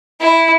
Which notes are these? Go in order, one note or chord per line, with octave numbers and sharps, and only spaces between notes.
E4